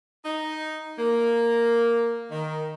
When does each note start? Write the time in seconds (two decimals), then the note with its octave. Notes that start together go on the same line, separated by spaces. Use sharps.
0.25 D#4
0.99 A#3
2.31 D#3